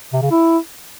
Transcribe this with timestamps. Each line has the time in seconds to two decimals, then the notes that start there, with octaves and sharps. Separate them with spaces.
0.13 C3
0.22 C#3
0.31 E4